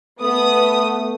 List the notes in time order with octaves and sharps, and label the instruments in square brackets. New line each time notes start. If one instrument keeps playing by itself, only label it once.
[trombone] A3 [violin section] B3 D#6